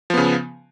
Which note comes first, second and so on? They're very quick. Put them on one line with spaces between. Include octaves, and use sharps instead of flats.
F3 B3 C#3